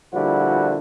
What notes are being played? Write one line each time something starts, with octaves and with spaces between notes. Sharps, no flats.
A#2 D3 F3 G3 E4 F#4